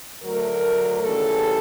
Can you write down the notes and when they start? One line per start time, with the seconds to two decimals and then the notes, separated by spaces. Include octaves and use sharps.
0.22 D2 D3 F#3 A3 A#4
1.02 D#2 C#3 E3 G3 A4